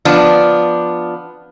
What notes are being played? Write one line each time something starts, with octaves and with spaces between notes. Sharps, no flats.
F3 B3 D4